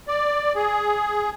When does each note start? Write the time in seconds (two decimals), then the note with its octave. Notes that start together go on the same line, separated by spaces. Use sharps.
0.08 D5
0.56 G#4